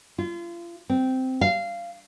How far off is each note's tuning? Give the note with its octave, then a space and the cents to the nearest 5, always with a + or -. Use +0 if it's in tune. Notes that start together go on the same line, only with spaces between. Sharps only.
F4 -35
C4 -10
F5 -15